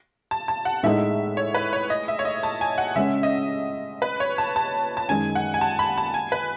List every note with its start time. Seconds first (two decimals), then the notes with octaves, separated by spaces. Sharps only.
0.31 A5
0.48 A5
0.65 F#5
0.83 A2 G#3 D#4 G#4 E5
1.37 C#5
1.54 B4
1.73 C#5
1.90 D#5
2.08 E5
2.19 C#5
2.25 D#5
2.43 A5
2.61 G#5
2.78 F#5
2.95 C#3 G#3 C#4 G#4 E5
3.23 D#5
4.02 B4
4.20 C#5
4.38 A5
4.56 A5
4.97 A5
5.08 F#2 D#3 G#3 G#5
5.35 F#5
5.54 G#5
5.61 A5
5.79 B5
5.98 A5
6.14 G#5
6.32 B4